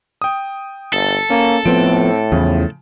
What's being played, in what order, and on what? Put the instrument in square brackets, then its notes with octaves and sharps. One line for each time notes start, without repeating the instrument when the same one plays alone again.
[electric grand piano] G5 D#6
[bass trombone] G1 [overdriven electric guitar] A4
[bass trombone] A#3 [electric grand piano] C#4
[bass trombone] A2 [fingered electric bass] F3 B3 [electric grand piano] C4 D7
[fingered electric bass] E2 [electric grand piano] C#3 F3